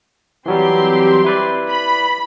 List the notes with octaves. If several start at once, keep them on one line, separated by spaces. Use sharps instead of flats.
E3 F#3 G3 C4 G4 C6
E4 B4 D5
B5